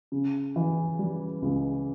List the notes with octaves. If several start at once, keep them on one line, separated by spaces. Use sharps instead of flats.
C#3
E3
G3
C#2